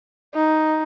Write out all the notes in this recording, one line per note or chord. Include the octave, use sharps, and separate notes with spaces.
D#4